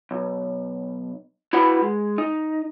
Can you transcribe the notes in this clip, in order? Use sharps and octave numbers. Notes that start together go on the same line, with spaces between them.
B1
E4 F#4 B4 F#5 B5
G#3
D#4